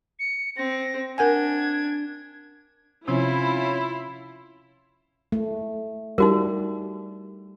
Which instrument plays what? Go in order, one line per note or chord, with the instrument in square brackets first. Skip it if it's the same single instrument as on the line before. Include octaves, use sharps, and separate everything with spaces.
[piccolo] C#7
[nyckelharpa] C4 [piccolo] A#6
[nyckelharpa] D4 [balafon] A#4 F#5 G#5 [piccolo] G#6
[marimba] C3 F3 C4 [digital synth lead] C#4 [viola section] E4 [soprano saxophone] F4
[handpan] A3
[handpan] G3 [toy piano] D#4 F#4 A#4